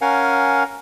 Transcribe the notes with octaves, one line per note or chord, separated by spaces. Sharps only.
C#4 A#4 F5 F#5 G#5